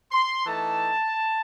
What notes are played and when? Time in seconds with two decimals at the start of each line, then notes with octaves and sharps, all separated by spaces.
0.12 C6
0.45 E3 A3 D#4 A5